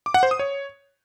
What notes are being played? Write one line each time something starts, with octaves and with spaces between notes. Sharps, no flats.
D6
F#5
C5
D#6
C#5